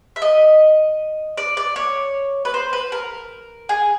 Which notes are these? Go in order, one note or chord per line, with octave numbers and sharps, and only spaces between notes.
E5
D#5
D5
D5
C#5
B4
C5
B4
A#4
G#4